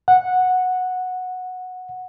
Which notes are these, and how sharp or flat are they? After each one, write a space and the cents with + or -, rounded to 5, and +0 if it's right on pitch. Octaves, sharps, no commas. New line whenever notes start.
F#5 -10